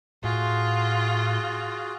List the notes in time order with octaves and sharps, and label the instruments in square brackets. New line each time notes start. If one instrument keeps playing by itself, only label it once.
[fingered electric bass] A2 [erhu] F4 [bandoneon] F#4 G#4